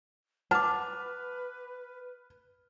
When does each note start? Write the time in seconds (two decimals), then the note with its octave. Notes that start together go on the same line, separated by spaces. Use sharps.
0.51 B4 F#5 A5 D6 F6